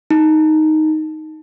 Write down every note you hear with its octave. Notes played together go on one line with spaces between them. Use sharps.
D#4